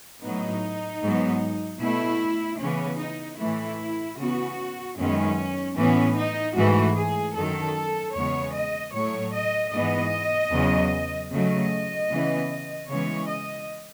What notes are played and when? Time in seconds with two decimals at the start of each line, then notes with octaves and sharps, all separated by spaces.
0.23 A2 F#3 B3 D#4
1.03 G#2 F#3 B3
1.81 B2 A3 E4
2.60 C#3 E3 B3 C#4
3.00 D#4
3.39 A2 E3 A3 E4
4.19 C#3 E3 B3 F#4
4.98 F#2 D#3 G#3 B3 C#4
5.77 A2 E3 B3 C#4
6.17 D#4
6.56 G#2 E3 A3 F#4
6.96 G#4
7.35 F#2 D#3 F#3 A4
8.15 E2 C#3 G#3 B3 C#5
8.54 D#5
8.93 A2 F#3 A3 C#5
9.34 D#5
9.72 G#2 E3 B3 D#5
10.52 E2 C#3 F#3 B3
11.31 C#3 F#3 A3 D#5
12.10 C#3 E3 B3
12.89 C#3 E3 G#3 B3 C#5
13.29 D#5